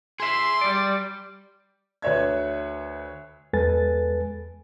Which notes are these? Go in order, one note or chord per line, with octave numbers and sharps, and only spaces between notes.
G#4 E5 C6
G3 D5
D2 B4 C#5 E5 G#6
E2 G#3 A4 B4 G#5 A6